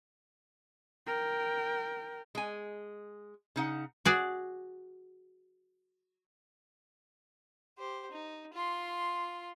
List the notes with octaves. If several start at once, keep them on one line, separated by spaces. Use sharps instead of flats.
A#4 G5
G#3 G#5
C#3 D#4 F#5
F#4 G#4 D5
G4 C5
D#4
F4 C6